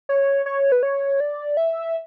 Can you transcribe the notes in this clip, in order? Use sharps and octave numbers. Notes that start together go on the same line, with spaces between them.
C#5
C#5
B4
C#5
D5
E5